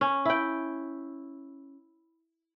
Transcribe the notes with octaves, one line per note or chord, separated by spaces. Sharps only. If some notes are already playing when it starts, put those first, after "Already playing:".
C#4
E4 G5